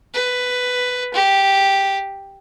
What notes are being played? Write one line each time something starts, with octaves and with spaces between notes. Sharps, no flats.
B4
G4